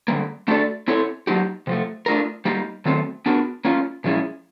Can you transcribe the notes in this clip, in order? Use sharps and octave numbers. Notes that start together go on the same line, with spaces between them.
D3 G3 A#3
A3 D4 F#4 A4 D5
C4 E4 A4 C#5
F#3 A#3 D#4 G4
C3 F3 A3
A3 D4 F4 A#4
G3 A#3 D#4 G4
D#3 F#3 A3 C4
B3 D4 F#4 A#4
A#3 C#4 F4
A#2 F3 G#3 C#4 E4